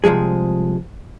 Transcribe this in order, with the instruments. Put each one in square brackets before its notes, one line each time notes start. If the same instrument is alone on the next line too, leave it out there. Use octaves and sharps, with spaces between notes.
[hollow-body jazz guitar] C2 F#2 F3 G#3 G#4